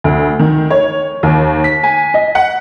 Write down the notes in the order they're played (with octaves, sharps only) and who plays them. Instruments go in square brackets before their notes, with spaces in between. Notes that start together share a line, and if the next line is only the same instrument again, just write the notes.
[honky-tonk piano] D2
D#3
C#5
D#2
B6
G#5
D#5
F#5